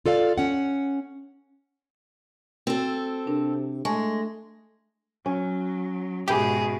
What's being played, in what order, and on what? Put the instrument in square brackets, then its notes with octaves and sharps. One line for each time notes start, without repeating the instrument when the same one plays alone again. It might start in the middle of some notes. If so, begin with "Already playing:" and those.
[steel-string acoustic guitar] F4 A4 D5 F5
C#4 F#5
[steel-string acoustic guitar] C4 A4 [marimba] F#4
[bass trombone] C3 [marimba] D4 A#4
[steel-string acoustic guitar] G#3 [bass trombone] A3 [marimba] G#5 A5 C#6
[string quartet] F#3 [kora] C#4
[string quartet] G#2 B2 [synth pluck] G4 [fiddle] G#4 [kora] B4 E5